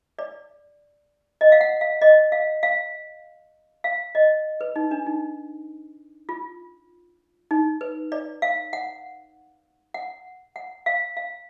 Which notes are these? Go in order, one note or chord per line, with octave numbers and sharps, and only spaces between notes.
D5
D#5
F5
F#5
F5
D#5
F5
F5
F5
D#5
B4
D#4
D4
D#4
F4
D#4
B4
D5
F5
F#5
F#5
F#5
F5
F5